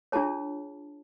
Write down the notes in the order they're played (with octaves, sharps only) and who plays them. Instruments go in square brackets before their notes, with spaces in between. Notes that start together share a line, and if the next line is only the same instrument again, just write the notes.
[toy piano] D4 F4 G#4 C#5 A5